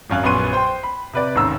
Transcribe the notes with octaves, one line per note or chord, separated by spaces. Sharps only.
G#1 F#2 F5 F#6
A#1 F#2 B3 C6 C#6 D#7
C5 G5 C6
B5
C3 B4 D5
A1 D#2 G#2 C#3 A#5 E6